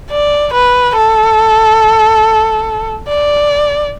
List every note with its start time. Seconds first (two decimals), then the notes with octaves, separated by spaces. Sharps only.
0.11 D5
0.54 B4
0.97 A4
3.09 D5